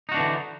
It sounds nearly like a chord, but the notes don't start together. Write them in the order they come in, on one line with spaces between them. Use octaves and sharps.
D#4 F#4 D4 E3 D3